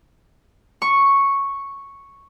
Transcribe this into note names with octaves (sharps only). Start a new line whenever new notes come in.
C#6